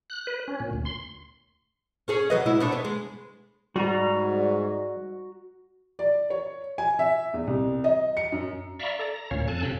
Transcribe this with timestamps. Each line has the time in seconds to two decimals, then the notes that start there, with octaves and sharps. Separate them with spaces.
0.10 F#6
0.27 B4
0.48 C#4
0.60 A#2
0.73 D2
0.85 C6
2.08 C#4 G#4 C#5
2.30 F#3 B4 D#5
2.46 A#2 G#3 E4
2.60 B3 D4 C#5
2.72 B4
2.85 G#3
3.76 G#2 G3 F#4 A#5
5.99 D5
6.30 C#5
6.78 G#5
6.99 E5
7.34 E2
7.47 C2
7.84 D#5
8.17 C#7
8.32 F#2
8.79 D5 E5 F5 A#5 B5 C#6
8.99 A4 D5 A#5
9.14 A#5
9.31 D2 A#2 C#4 C#5 F5
9.48 F2 A4 G#5 A5 F#6
9.63 F#2 C3 C#4 F5 G5 B5